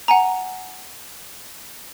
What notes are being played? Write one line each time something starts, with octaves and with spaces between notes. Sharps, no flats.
F#5 G#5 A#5